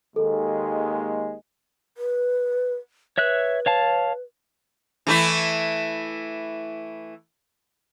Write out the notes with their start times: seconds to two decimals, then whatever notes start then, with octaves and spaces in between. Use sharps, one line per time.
0.16 D#2 G#3 A4
1.98 B4
3.18 B4 C#5 E5 F#6
3.66 C#5 F5 A5
5.07 E3 A3 E4